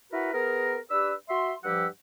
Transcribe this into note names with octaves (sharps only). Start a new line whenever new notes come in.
E4 F#4 A#4 B4 F#5
B3 G#4 A#4
D4 G4 B4 E6
F#4 E5 C6
G2 F3 G4 F#5 E6